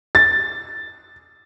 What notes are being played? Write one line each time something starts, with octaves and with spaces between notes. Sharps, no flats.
A6